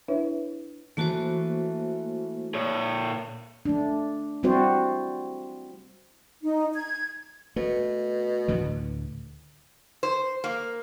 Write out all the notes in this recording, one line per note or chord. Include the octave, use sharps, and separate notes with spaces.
D4 E4 B4 C#5 E5
E3 A3 A#3 C#4 F#4 C5
A#2 C#5
A3 D4
G3 C4 E4 F#4 C5 D5
D#4
G#6
B2 A3
D2 A2 D3
C5
A#3